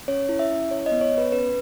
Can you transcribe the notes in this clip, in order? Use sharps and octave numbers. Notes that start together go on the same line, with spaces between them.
C#4 C#5
E4
E5
C#4
E4 C#5
D#5
B3
C#5
B3
B4
C#4 B4